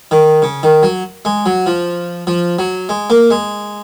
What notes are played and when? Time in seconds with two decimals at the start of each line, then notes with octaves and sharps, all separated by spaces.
0.11 D#3
0.42 C#3
0.63 D#3
0.83 F#3
1.25 G#3
1.46 F#3
1.66 F3
2.27 F3
2.59 F#3
2.89 G#3
3.10 A#3
3.30 G#3